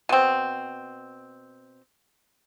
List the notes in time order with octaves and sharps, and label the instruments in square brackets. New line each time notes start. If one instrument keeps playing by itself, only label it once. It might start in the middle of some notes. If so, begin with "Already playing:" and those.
[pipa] B2 C4